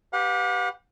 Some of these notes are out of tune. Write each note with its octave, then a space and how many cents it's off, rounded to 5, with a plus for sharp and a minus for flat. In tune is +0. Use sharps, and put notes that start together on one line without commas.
G4 -5 B4 +0 F#5 -45